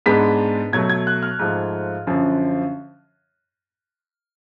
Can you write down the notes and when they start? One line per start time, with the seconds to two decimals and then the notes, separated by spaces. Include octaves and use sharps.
0.06 G#2 G#3 B3 D4 B6
0.72 B2 F#3 A3 G#6
0.90 G#6
1.07 F#6
1.23 F6
1.39 G#2 F3 A3
2.07 F#2 D3 F3